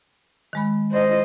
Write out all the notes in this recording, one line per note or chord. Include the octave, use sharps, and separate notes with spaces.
D#3 G#3 B5
C5 D#5